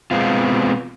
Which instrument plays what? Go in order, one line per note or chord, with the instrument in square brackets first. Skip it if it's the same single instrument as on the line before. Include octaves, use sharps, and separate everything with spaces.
[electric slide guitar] B2 G#3 B3 C4 F4